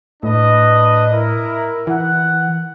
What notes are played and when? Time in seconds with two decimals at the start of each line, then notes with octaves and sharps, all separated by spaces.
0.23 A2 D4 B4 D#5
1.12 E4 A#4
1.87 E3 F#5